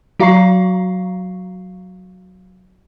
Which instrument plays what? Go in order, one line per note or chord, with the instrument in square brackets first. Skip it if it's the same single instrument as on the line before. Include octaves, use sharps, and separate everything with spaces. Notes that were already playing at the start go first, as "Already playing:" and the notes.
[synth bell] F#3 F#4 F5 A#5 C#6 C7